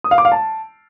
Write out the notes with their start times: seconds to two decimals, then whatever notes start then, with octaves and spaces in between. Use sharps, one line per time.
0.04 D#6
0.11 F5
0.18 D6
0.25 F5
0.32 A5